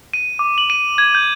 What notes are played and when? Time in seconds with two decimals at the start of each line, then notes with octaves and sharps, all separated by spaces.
0.13 D#7
0.39 D6
0.58 F#7
0.70 D#7
0.98 G#6
1.15 G6